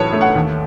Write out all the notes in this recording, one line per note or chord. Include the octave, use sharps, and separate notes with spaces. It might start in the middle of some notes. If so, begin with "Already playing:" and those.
Already playing: A1 A2 F#3 B4 C#5 A5
A3
F#5
D#2